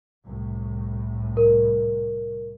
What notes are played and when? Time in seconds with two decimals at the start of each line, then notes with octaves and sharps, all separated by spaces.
0.26 C2 A2
1.37 A#4